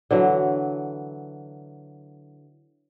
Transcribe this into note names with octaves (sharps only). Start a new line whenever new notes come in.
D3 E3 F#3